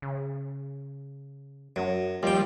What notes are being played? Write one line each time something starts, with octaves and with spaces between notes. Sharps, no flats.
C#3
F#2 F#3
D#2 F3 G3 G5